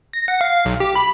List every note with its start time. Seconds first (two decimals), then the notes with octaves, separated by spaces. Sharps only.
0.13 A#6
0.28 F#5
0.41 F5
0.65 B1
0.80 G4
0.95 B5